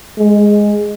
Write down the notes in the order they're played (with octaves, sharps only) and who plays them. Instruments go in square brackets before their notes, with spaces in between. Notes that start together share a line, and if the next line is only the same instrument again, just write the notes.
[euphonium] G#3